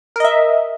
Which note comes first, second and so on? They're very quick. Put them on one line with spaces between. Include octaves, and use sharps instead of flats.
A#4 D#5 E5